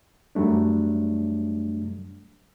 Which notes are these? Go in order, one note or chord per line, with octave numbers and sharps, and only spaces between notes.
F#2 F#3 G3 A3 D4